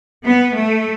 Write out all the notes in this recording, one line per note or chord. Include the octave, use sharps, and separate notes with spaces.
B3
A3